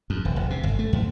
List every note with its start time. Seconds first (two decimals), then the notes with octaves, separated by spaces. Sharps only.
0.10 F2
0.25 D#1
0.36 E1
0.50 C3
0.63 G1
0.79 A3
0.93 E2